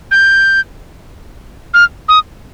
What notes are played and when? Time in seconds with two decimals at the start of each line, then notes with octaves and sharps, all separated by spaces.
0.11 G6
1.74 F6
2.08 D#6